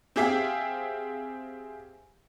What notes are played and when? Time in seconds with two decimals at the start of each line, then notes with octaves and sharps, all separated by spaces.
0.16 C4 G4 G#4 E5 F5 G5